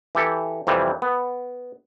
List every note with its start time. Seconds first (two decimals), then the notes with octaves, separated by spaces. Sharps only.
0.15 E3 G4 A4
0.67 F2 C3 E3 G3
1.02 B3